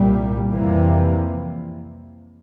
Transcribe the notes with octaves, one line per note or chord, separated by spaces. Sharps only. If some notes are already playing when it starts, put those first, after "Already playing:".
Already playing: C2 A#2 G3
F2 C3 E3 G3 A#3